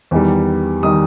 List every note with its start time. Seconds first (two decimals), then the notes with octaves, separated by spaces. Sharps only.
0.11 E2 D#3 G3
0.83 D#3 G3 D#6